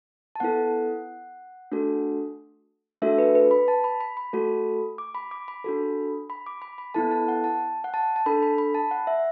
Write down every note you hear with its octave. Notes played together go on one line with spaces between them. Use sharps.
A5
B3 E4 A4 F#5
A3 D4 F#4 A4
A3 D4 F#4 A4 E5
B4
B4
B5
A5
B5
B5
B5
A3 F#4 A4
D6
B5
D6
B5
D4 F#4 A4
B5
D6
B5
B5
B3 E4 A4 A5
A5
F#5
A5
F#5
A5
A5
D4 A4 B5
B5
B5
A5
F#5
E5